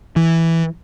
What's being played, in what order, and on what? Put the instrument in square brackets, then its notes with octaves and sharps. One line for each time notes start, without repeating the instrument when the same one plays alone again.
[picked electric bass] E3